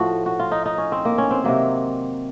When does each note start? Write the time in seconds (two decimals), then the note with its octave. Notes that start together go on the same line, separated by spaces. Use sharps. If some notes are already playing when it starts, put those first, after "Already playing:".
Already playing: A2 F3 F#4
0.26 F#4
0.40 F4
0.52 D#4
0.66 D#4
0.78 C#4
0.92 C4
1.05 A#3
1.18 C#4
1.31 C4
1.44 C3 D#3 F#3 A#3